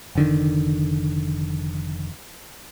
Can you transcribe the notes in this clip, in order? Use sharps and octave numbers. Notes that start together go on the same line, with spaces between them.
F1 D3 D#3